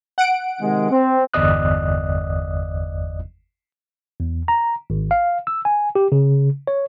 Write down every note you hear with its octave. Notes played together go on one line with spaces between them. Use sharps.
F#5 D7
C3 D#3 G#3
C4
G1 E2 D5 D#5 D#6 F#6
E2
A#5
G#1
F5
E6
G#5
G4
C#3
C#5